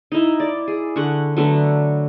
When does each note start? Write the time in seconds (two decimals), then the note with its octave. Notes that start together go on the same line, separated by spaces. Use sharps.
0.12 D#4 E4
0.40 D5
0.68 G#4
0.96 D3 F#5 C#6
1.37 D3 F#3 A3 B3